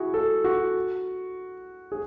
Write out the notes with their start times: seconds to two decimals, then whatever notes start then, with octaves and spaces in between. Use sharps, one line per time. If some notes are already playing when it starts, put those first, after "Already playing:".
Already playing: E4 F#4 G#4
0.14 A4
0.44 F#4
1.92 G#4